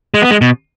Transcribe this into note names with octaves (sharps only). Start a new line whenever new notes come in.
G#3
B3
G#3
B2